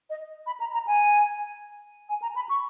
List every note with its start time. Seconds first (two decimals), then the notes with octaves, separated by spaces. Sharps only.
0.10 D#5
0.46 B5
0.60 A#5
0.73 A#5
0.87 G#5
2.09 G#5
2.22 A#5
2.36 B5
2.49 C#6